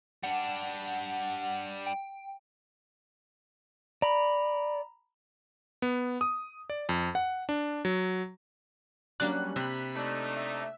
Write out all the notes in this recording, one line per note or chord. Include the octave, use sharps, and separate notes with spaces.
G3 D4 F#5
G5
D5 A#5 B5
B3
D#6
D5
F2
F#5
D4
F#3
F#3 G3 A#3 C#4 D4 D5 F#6
C3 C4 B5
A3 D4 D#4
E5